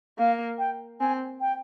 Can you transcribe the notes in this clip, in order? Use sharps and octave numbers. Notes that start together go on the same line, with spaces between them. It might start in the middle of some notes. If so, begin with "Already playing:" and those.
A#3 F5
G5
C4 G#5
G5